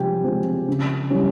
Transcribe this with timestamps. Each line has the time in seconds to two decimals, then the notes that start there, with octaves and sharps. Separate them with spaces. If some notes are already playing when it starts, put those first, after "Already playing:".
Already playing: C3 F3 G#3 C4 G4 G5 G#5
0.24 F3 G#3 C4
0.68 C#3
1.10 E3 G3 C#4